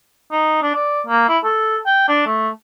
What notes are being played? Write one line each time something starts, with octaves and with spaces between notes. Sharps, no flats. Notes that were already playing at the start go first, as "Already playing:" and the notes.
D#4
D4
D5
A#3
E4
A4
G5
D4
A3